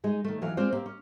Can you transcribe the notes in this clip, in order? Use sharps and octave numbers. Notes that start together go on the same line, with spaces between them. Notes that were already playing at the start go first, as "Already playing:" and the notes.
G#3 D#4 G#4
D#3 A3
D#2 E3 F#3 F#4 F5
G#3 C4 F4 C5 D5
A#3 C4 G4
C#4